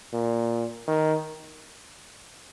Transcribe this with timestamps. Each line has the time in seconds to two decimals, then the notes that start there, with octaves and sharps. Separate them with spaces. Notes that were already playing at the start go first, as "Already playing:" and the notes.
0.13 A#2
0.87 D#3